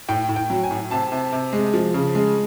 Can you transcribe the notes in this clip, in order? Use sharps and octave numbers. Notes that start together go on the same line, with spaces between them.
A2 G5
A2
G5
F#3
G#5
A2
C3 A5
C3
C3
G#3
F3
C#3
G#3